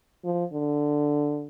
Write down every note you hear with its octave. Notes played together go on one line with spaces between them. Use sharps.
F3
D3